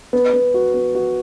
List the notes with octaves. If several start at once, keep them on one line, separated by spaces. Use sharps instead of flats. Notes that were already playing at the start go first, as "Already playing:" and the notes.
B3
B3
F#4
B3
F#4